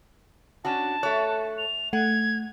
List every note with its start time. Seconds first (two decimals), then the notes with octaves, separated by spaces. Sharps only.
0.65 C#4 D4 F#4 A5
1.03 A3 C#5 F#6
1.58 F7
1.93 A3 F#5 G#6